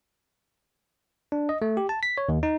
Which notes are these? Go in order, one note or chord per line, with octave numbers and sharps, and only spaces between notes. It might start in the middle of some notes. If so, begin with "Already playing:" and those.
D4
D#5
A3
G4
A5
B6
C#5
D#2
D#4